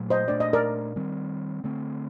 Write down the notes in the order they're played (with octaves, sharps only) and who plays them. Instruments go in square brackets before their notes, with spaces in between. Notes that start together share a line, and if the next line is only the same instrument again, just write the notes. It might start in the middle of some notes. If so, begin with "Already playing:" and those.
Already playing: [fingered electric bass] A#2 F#3 A3
[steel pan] C5 D#5
[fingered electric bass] A#2 A3 D4 [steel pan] D5
[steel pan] D#5
A#4 D5
[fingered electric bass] D#3 G3 C4
D3 A3 C4